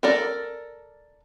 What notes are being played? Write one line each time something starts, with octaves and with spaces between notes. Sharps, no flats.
A4 A#4 D5